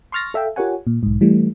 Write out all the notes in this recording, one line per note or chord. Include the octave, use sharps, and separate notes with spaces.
C6 C#6 F6 A6 A#6
A4 E5 F5 G5
F4 G4 A#4 C#5 F#5 G#5
A#2
B1 G#2
E3 G3 A3